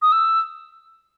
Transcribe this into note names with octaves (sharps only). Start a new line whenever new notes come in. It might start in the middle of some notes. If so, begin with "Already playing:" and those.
D#6
E6